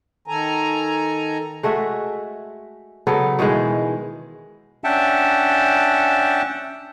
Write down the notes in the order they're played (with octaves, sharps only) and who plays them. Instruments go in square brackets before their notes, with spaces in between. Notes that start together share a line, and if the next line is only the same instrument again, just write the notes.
[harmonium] D#3 A4 G#5 A#5
[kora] G#3 A3 F#4 E5
C#3 F#3 B3 A4
B2 D#3 E3 G#3
[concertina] C#4 D4 E5 F#5 G5 A5